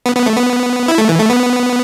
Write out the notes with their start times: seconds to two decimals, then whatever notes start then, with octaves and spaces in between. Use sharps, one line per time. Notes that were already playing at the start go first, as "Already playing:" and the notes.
0.06 B3
0.16 B3
0.26 A3
0.36 B3
0.88 E4
0.98 A3
1.09 E3
1.19 A3
1.30 B3